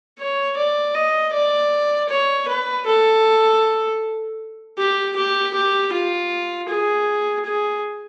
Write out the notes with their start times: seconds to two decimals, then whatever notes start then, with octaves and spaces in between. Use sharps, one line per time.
0.19 C#5
0.57 D5
0.95 D#5
1.33 D5
2.10 C#5
2.48 B4
2.86 A4
4.78 G4
5.16 G4
5.54 G4
5.92 F4
6.69 G#4
7.46 G#4